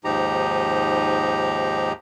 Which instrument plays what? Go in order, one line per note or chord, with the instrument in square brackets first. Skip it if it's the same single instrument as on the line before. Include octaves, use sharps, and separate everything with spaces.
[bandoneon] D#2 G#2 F3 D#4 G4 A#5